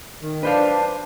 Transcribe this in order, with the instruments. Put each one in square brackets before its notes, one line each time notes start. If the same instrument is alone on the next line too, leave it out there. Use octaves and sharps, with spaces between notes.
[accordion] D#3
[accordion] D4 [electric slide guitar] B4 C5 F5